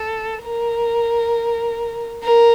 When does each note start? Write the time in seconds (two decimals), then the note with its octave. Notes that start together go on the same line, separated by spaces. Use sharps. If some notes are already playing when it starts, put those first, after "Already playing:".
Already playing: A4
0.43 A#4
2.23 A#4